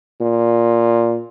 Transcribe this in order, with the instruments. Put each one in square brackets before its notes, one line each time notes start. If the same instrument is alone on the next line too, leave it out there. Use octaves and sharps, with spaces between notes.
[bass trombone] A#2